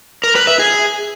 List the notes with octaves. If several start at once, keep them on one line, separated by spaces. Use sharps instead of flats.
A#4
B4
E5
G#4